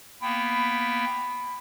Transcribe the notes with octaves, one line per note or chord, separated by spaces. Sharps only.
A#3 B3 G5 B5